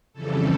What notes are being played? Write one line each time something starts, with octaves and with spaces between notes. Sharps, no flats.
F2 C#3 E3 G3 A4